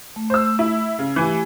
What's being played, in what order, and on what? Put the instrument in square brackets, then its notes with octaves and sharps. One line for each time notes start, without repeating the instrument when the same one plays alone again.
[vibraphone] A3
[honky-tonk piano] C5 E6
E4
C#3
[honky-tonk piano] E3 G#5 [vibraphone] A3 E4 G4